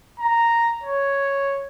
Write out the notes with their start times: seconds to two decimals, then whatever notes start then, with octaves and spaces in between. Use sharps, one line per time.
0.20 A#5
0.84 C#5